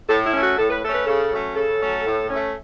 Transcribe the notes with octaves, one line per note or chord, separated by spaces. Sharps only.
A2 A4
E4
A3 C#4
F#4
A2 A4
B4
A3 C#4 A4
B4
C#3 A4
F#3 A3 C#4
C#3 A4
F#3 A3 C#4
A2
A3 C#4